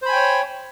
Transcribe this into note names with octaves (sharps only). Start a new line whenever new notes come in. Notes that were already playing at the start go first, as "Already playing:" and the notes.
C5 C#5 G5 G#5 B5